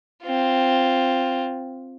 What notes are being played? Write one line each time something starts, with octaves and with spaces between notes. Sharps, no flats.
C4 F4